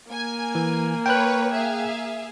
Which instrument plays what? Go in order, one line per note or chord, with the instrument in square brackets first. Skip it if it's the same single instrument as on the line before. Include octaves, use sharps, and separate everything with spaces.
[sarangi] A#3 [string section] G#5
[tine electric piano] E3
[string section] B4 C#5 [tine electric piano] G5 F#6
[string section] G#4 E5 F5